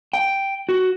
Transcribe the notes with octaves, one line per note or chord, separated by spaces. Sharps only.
G5
F#4